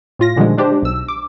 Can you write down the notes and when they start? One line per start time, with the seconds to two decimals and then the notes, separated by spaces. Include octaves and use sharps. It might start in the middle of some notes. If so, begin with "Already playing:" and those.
0.19 A2 F4 A#6
0.36 A#2 D3 D#3 F3 G3 G#3
0.57 G#3 D4 G4 C5
0.82 B1 E6
1.08 D6